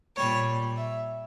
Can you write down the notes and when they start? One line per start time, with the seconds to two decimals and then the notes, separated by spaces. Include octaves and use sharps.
0.16 A#2 G3 C#5
0.76 E5